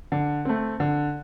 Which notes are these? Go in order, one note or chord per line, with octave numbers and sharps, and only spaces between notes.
D3
A3 C4
D3